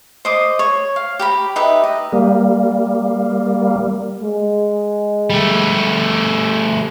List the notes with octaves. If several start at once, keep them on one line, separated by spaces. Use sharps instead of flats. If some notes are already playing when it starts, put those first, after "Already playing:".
C5 D#5 D6
C#5
F5
G4 A#5 B5
D#4 G4 B4 E5
D#5
G3 A#3
G#3
G3 A3